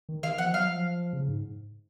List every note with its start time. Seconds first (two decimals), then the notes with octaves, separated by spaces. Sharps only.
0.09 D#3
0.23 D#3 F5
0.38 F3 F#5
0.53 F#3 F5
0.69 F3
1.13 C#3
1.28 G#2